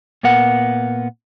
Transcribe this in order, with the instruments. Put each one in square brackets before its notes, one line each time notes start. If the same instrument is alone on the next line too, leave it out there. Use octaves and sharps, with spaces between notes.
[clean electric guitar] A#2 B3 A#4 F#5